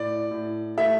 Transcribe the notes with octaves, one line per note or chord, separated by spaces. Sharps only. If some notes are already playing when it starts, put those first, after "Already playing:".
Already playing: A2 D5
A2
A3 E5